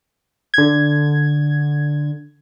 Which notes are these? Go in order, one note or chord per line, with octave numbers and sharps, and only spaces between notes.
D3 G#6